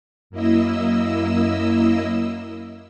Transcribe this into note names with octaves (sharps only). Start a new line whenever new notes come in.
F#2 A#3 E4 D#5 E6